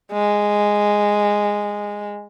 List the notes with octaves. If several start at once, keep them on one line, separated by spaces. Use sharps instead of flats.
G#3